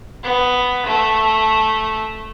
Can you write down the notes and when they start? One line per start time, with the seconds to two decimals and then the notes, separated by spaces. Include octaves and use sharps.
0.23 B3
0.86 A3